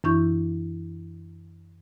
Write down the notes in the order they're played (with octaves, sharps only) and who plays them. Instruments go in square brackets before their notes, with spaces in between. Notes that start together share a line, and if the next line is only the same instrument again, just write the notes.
[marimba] F#2 E3 D4 E4 C#6 G6